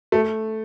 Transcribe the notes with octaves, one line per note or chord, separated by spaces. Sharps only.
A3